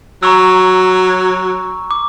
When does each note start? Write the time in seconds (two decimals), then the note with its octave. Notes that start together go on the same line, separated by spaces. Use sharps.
0.23 F#3 A#5 C#6 E6
1.91 D6